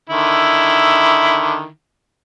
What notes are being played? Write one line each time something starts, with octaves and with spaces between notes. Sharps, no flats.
D3 D#3 E4